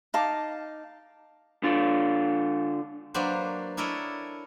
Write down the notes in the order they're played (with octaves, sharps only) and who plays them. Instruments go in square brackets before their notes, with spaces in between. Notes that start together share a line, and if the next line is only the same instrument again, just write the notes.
[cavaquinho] D#4 F5 A5 D6
[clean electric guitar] D3 F4
[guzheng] F#3 A#3 D4 B4 C5
D4 E4 A4 A#4 C#5 D#5